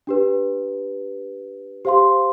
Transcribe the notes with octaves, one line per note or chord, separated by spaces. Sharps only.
D4 G4 B4
G4 C5 F5 C6